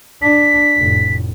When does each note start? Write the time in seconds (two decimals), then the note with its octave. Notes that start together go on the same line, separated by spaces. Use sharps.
0.22 D4 B6
0.78 F1 A2